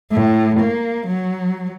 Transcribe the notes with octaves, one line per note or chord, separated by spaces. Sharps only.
A2
A#3
F#3